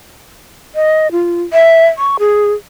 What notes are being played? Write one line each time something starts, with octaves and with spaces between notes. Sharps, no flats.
D#5
F4
E5
C#6
G#4